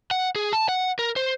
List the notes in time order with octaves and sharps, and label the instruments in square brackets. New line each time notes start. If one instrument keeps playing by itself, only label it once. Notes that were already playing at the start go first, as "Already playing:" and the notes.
[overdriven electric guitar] F#5
G#4
A5
F#5
A#4
C5